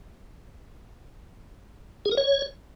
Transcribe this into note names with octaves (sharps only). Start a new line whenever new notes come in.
G#4
A#4
C#5